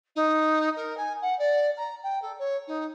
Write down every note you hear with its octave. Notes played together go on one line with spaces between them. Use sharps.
D#4
A#4
G#5
F#5
D5
A#5
G5
A4
C#5
D#4